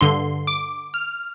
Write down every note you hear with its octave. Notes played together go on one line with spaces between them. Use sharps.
G2 D3 C6
D6
F6